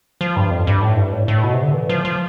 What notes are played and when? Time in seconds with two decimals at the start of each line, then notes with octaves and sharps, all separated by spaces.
0.21 F3
0.37 G2
0.51 F2
0.67 G2
0.81 A2
0.97 G2
1.13 A2
1.28 A2
1.43 B2
1.53 C3
1.63 D3
1.74 E3
1.89 F3
2.05 F3